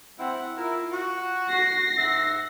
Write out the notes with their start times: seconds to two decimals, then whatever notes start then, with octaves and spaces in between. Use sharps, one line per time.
0.19 C4 E4 E5 F#5
0.57 E4 F4 A#4
0.92 F#4
1.49 A#6 C7
1.98 G#2 E5 F#5